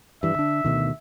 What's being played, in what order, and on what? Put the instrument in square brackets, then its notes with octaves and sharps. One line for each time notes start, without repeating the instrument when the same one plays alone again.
[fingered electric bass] G2 E3 [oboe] E5
[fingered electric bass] D3 D4
D2 B2 D#3